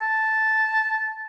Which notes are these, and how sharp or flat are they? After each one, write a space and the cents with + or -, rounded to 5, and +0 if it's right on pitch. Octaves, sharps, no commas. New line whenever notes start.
A5 -5